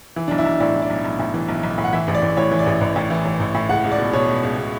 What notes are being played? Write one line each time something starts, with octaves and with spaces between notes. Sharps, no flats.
E3
B1 D4
E4
B1
A2 D5
E3
D5
B1
B1
A2
E3
B1
B1
A2
F#5
E3 E5
A1
D5
A1
A2 C#5
E3
D5
A1
A1
A2
E3
A1
A1
A2
C#2 F#5
C#2
D5
B2
B2 C#5
C#2
C#2
B2